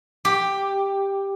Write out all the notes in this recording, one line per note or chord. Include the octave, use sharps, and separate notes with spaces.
G4